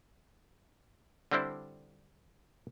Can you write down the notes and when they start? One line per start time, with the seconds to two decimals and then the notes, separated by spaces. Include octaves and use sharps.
1.31 D3 G3 C4 D4 E4 C5